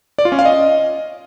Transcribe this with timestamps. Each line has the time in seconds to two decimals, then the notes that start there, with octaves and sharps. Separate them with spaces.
0.18 D5
0.25 F4
0.32 C#4
0.39 F5
0.45 D#5